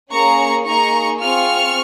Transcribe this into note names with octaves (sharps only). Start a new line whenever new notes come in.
A#3 C#4 G#4 A#5 C#6
A#3 D#4 G#4 A#5 C#6
C4 F4 G#4 C#6 F6